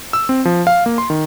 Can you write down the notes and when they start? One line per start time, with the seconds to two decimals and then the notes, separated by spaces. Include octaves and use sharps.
0.13 E6
0.29 C4
0.45 F3
0.67 F5
0.86 A#3
0.98 C6
1.10 D#3